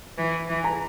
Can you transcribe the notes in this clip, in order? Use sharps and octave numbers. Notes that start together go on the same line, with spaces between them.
E3
E3
A#5